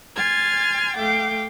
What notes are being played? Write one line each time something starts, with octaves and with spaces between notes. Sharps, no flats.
G#5 C6 F6 G#6 A6
A3 F5 G5 D6